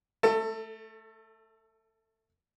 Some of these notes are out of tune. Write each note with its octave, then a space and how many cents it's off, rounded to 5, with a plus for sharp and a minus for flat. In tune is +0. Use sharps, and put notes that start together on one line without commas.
A3 -10 A4 +25